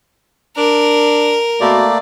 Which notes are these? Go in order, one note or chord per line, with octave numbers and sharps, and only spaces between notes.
D4 A#4
B2 A3 A#3 D5